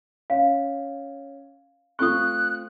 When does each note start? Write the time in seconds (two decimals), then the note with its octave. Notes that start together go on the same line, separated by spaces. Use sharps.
0.30 C#4 F5
1.99 A3 C4 F4 C#6 D#6 F#6